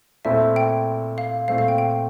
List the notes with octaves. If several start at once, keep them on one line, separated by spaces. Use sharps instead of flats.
A#2 A3 C4 E4 A4 E5
G5
F5
A#2 A3 C4 F5
F5
G5
G5